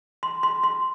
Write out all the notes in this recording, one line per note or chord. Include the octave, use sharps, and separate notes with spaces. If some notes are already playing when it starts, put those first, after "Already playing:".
C6
C6
C6